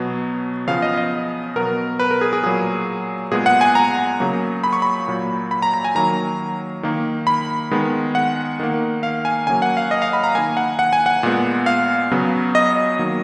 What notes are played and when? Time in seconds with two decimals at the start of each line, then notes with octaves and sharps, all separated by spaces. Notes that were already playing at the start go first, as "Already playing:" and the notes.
Already playing: B2 F#3 B3
0.67 C#3 F3 B3 F5
0.82 D#5
0.97 D#5
1.56 B2 F#3 B3 A#4
1.99 B4
2.11 A#4
2.21 G#4
2.33 G#4
2.43 A#2 F#3 A#3 G#4
3.31 A#2 G#3 B3 G#4
3.46 F#5
3.61 G#5
3.75 A#5
4.20 C#3 F#3 A#3
4.64 B5
4.73 C#6
4.82 B5
5.08 A#2 F#3 A#3
5.51 B5
5.62 A#5
5.74 A#5
5.85 G#5
5.95 D#3 F#3 A#3 A#5
6.83 D#3 A#3
7.27 B5
7.71 D#3 G#3 B3
8.15 F#5
8.59 D#3 A#3
9.03 F5
9.25 G#5
9.47 C#3 F#3 A#3 G#5
9.62 F#5
9.77 F5
9.91 D#5
10.02 F5
10.13 B5
10.24 A#5
10.35 D#3 A#3 G#5
10.57 F#5
10.79 F#5
10.93 G#5
11.06 F#5
11.23 A#2 G#3 B3
11.66 F5
12.11 C#3 F#3 B3
12.55 D#5
12.99 D#3 F#3 A#3